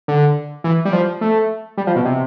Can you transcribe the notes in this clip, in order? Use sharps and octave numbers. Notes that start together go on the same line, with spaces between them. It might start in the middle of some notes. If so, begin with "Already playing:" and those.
D3
E3
G3
F3
A3
G3
F3
B2
C3